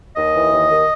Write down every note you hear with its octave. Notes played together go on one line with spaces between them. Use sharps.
D#2 D#5
E3
D#2
D#2